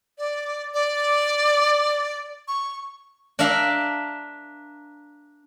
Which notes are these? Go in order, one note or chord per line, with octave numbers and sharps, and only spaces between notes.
D5
D5
C#6
D4 A#4 E5 F5